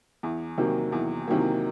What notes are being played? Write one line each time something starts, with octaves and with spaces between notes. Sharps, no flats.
E2
C3 D#3 F#3 A#3
E2
C3 D#3 F#3 A#3